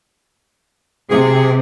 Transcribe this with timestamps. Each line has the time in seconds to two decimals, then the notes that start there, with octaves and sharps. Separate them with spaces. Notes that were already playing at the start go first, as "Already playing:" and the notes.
1.10 C3 G#4